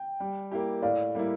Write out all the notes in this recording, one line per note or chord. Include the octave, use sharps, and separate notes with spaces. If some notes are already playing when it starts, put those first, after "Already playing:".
Already playing: G5
G3
A#3 E4 G4
A2 D5 F5
G3 A#3 E4